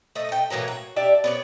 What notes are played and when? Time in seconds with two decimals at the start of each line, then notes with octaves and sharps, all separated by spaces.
0.15 A3 D#5 E5
0.29 A3 G5
0.50 A2 E3 F#3 A#3
0.68 F#4
0.96 D4 G4 D5 E5
1.24 B3 C#5 D5